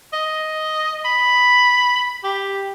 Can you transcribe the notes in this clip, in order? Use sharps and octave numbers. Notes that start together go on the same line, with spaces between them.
D#5
B5
G4